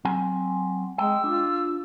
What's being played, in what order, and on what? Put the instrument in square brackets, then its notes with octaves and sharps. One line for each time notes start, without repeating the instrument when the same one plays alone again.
[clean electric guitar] F#3 C4 G#5
[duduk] G#3 [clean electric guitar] G5 [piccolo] E6
[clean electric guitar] D4 [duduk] F4